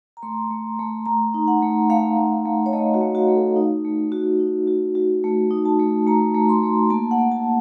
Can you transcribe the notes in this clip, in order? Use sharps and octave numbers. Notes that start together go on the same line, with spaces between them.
A#5
A3 C6
A3
A3
A3 A#5
D#4
F#5
A3
A3 F5
A3
A3
C#5
A3 D#5
F#4
A3
F#4
A3
A4
D#4
A3
F#4
D#4
F#4
F#4
A3
D#4
A5
A3
A3 A#5
A3
C6
A3
A#3 A5
F#5
A#3
A5